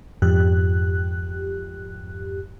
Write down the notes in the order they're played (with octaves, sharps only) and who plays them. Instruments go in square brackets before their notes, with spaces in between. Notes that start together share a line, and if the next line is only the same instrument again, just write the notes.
[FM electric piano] F2 G#2 G4 F#6